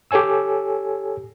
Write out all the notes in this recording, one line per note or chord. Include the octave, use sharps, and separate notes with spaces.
G4 A4 C#5 G#5 E6